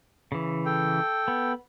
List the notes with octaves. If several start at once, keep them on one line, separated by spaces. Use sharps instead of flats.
C#3 E3
A4 G5
B3